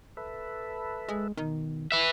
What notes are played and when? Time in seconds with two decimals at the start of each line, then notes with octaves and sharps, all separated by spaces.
0.17 A4 B4 E5
1.09 G#3
1.37 B2 D#3
1.92 B4 E5